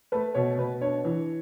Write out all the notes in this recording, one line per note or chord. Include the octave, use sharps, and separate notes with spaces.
A3 B4
B2 C#5
B2 B4
D4 C#5
E3